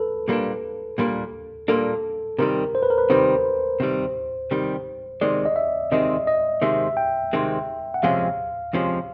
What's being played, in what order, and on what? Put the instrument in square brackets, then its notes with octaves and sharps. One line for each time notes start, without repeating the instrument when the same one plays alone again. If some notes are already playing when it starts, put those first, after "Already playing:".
Already playing: [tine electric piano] A4 B4
[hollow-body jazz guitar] A#2 G3 A#3 D4
A#2 G3 A#3 D4
[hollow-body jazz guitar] A#2 G3 A#3 D4 [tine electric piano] A4
[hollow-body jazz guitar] C3 D#3 G3 [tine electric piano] A#4
[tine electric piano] C5
B4
A#4
B4
[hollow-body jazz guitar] C3 D#3 G3 [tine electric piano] C5
[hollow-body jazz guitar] C3 D#3 G3
C3 D#3 G3
[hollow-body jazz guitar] C3 D#3 G#3 C4 [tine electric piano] D5
[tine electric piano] D#5
E5
[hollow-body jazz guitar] C3 D#3 G#3 C4 [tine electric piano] D#5
[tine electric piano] D#5
[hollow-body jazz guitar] C3 D#3 G#3 C4 [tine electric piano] E5
[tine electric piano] G5
[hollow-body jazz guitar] C3 D#3 G#3 C4
[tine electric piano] F#5
[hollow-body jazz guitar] F2 C3 F3 G#3 C#4 [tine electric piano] F5
[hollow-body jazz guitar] F2 C3 F3 G#3 C#4